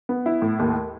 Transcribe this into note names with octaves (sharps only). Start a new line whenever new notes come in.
B3
E4
A2
D#2